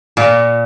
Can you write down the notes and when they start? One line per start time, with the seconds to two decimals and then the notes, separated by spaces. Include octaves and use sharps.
0.17 A#2